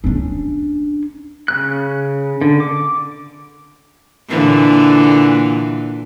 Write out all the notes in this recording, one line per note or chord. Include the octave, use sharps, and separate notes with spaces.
C#4 D4
C#3 F#6
D3
D6
A#2 D3 E3